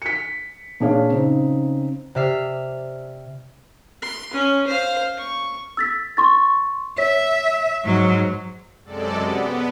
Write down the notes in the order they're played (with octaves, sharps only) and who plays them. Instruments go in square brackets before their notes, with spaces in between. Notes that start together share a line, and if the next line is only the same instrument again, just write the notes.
[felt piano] B6 C#7
A#2 D4 G#4 C#5 F5
C#3 C4 D#4
[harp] C3 D5 E5 F6 C7
[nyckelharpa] C6
C#4
C5 F5
C#6
[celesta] E6 A6 B6
C6 C#6 A6
[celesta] C#5 B6 [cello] E5
[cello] G#2 F#3
[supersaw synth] F#2 C3 G#3 A4 D5
B3